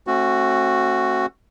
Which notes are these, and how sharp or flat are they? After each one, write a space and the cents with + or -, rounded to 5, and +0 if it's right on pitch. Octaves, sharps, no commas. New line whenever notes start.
A3 +5 C4 +45 F#4 +0